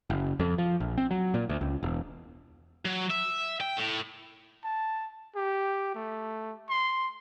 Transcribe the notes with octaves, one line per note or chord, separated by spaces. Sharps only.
F#1
F2
F3
A#1
C4
F#3
A#2
D2
C#2
E1
F#3
E5
G5
A2
A5
G4
A3
C6